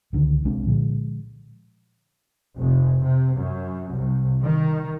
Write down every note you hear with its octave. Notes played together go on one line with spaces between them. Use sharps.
C#2 D3 D#3
C2 G#3 C4 D4
A#2 D3 F3 G#3
F1
C3
F#2
C2
D#3